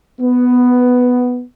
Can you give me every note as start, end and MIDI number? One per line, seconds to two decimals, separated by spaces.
0.21 1.41 59